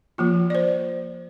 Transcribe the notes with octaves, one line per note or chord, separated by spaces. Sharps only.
F3 A#3 F4
D5
C5